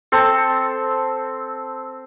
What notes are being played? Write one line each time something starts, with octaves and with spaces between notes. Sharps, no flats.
C4 A4